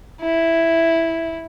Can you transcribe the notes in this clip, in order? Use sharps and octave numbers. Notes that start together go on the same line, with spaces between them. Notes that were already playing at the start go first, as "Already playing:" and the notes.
E4